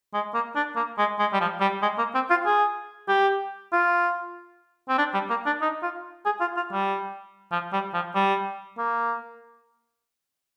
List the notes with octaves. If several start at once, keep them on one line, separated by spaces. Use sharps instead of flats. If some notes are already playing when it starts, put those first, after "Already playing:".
G#3
A#3
D4
A#3
G#3
G#3
G3
F3
G3
G#3
A#3
C4
F4
G#4
G4
F4
C4
D4
G3
A#3
D4
D#4
F4
G#4
F4
F4
G3
F3
G3
F3
G3
A#3